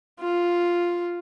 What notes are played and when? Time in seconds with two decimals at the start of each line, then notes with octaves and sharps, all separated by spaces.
0.20 F4